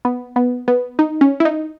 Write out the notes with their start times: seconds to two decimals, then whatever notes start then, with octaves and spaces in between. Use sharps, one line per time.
0.05 B3
0.36 B3
0.68 B3
0.99 D#4
1.21 C#4
1.40 E4
1.45 D#4